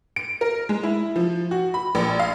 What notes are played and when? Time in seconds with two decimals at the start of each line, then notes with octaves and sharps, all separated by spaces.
0.16 D7
0.41 A#4
0.69 G#3
0.83 E4
1.16 F3
1.51 F#4
1.74 B5
1.95 A#1
2.19 F5